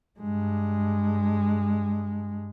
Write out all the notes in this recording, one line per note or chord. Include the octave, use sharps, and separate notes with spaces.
G2 G#3